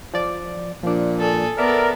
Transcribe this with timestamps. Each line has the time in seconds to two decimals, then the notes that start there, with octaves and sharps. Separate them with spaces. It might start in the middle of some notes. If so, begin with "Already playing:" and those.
0.14 F3 D5
0.83 A#2 F3 D4
1.20 G#4 A4
1.58 B3 A4 A#4 D5 E5